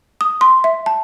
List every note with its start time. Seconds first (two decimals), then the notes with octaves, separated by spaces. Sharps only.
0.21 D#6
0.41 C6
0.64 E5
0.86 A5